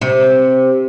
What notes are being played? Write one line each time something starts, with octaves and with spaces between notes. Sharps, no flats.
C3